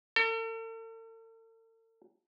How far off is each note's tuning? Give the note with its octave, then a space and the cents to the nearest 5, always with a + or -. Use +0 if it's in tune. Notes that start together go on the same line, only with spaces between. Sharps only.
A4 +45